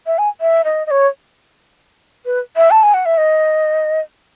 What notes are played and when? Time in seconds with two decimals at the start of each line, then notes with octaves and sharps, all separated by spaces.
0.07 E5
0.18 G#5
0.41 E5
0.65 D#5
0.87 D#5
0.91 C#5
2.26 B4
2.56 E5
2.71 A5
2.83 G#5
2.94 F#5
3.06 E5
3.18 D#5